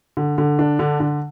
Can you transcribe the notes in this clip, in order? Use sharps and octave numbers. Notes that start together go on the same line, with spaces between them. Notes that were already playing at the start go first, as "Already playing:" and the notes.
D3
D3
D4
D3
D3